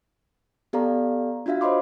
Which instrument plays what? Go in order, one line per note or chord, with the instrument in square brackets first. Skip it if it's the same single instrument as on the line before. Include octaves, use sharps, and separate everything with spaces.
[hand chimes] B3 G4 A4 D5 F5 A#5
D4 F4 F#4 E5 F5
C5 C#5 D#5 B5 C6 D6